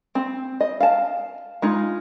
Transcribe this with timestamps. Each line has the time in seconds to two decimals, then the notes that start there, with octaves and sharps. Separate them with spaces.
0.15 C4
0.61 D#5
0.80 F5 A5
1.62 G#3 D#4 F4